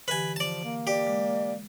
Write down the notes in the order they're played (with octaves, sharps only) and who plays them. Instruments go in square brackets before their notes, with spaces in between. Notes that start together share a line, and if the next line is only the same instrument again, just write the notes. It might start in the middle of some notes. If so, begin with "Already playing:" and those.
[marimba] D3 E3 G4 [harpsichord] B4 G#5
[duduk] F3 [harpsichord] D5 A5
[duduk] A#3
[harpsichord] G4 [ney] D5
[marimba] G#3